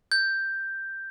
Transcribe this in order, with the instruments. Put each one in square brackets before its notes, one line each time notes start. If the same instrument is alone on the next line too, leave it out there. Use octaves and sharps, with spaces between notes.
[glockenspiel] G6